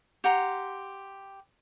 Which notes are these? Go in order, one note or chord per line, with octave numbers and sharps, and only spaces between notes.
G4 F#5 A#5 C6